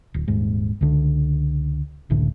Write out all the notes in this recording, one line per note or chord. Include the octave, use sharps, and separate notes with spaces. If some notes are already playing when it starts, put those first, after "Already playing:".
D1
D#1 G#2
C#2 D3
F1 C#2 A2 D3